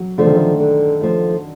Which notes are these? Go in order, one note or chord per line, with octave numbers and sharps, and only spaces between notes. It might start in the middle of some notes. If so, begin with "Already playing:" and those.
Already playing: F#3
D3 F3 A3
D#3
D3
D3
F3 A3